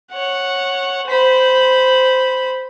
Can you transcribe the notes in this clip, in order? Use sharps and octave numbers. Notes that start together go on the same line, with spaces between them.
C#5 F#5
C5 B5